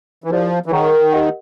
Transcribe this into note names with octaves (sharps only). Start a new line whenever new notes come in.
E3
F3 E4 G4 A#4 D5 F5
E3
D#3 G#4 C#5 F#5 A#5 C#6
G4 A#4 D#5 F#5